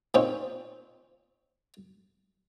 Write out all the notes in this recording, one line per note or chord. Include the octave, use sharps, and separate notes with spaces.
A#2 C4 C#4 D#4